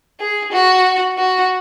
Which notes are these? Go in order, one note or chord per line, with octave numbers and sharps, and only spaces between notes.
G#4
F#4
F#4